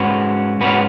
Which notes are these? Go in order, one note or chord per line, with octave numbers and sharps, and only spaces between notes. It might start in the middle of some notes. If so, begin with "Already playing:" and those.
Already playing: G#2 G#3 C#4 F#4 B4
G#2 G#3 C#4 F#4 B4